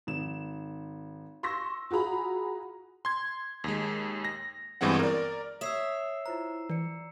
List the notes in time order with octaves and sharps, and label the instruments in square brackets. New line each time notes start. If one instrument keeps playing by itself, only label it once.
[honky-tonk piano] G#1 E7
C6 C#6 E6 A#6
F4 F#4 G#4 A#5 B5
[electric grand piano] C6 G#6
D#2 G#3
A#6
G1 G2 E3 G#3 C4 F#5
A#4 D5
[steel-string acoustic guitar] C#5 E5 [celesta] D#6 [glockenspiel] E6 C7 E7
[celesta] E4 F4 C5 [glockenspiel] A#5
[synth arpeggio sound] E3 [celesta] D5 C#7